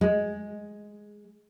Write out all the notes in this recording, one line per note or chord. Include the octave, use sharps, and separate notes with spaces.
G#3